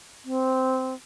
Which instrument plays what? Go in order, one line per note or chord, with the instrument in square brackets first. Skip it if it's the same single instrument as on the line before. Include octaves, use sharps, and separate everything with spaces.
[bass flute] C4